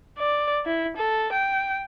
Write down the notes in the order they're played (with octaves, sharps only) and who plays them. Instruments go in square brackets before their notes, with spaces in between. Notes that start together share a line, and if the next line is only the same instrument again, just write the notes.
[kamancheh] D5
E4
A4
G5